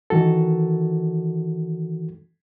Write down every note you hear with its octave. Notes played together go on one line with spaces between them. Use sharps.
D#3 E3 F#4 A4